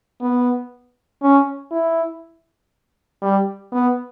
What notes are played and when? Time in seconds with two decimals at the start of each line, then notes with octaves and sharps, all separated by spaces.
0.21 B3
1.22 C#4
1.72 E4
3.22 G3
3.73 B3